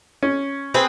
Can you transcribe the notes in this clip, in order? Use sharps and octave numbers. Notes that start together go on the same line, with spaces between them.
C#4
C4 G#4 B4